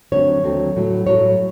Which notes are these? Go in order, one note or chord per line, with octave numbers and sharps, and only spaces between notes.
D#2 D3 F#3 A3 C4 C#5
D#2 D3 F#3 A3 C4
A2 F#3 A3
A2 F#3 A3 C#5